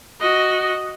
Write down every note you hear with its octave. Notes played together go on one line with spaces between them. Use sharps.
F#4 D#5